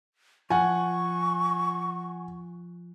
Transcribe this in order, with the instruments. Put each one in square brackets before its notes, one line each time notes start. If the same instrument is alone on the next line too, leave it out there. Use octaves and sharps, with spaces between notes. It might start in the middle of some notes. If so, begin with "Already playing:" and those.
[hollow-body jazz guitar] F3 [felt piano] F#5 G#5 [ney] C#6